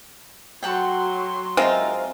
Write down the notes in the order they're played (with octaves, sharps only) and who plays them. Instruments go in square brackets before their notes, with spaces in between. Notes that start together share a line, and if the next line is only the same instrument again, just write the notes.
[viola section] F#3 C6 [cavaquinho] A4 F#5 G5
[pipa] G#3 C4 F4 [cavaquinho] D#4 A#4 E5